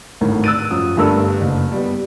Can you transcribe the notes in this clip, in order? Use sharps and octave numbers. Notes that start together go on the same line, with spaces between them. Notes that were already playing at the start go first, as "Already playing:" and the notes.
G#1 D2 A2 A#4
E6 F#6 A6 D7 D#7
F#2 F3 D#6
G1 G2 A3 A4 A#4 E6
F#1
G3 B3